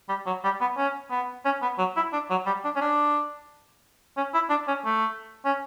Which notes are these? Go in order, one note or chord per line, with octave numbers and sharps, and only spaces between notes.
G3
F#3
G3
B3
C#4
B3
C#4
B3
F#3
E4
D4
F#3
G3
D4
C#4
D4
C#4
E4
D4
C#4
A3
C#4